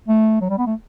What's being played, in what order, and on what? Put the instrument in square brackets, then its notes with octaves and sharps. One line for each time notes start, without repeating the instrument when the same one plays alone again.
[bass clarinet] A3
F#3
G3
B3
A3